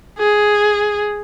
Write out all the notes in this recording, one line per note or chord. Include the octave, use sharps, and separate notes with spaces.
G#4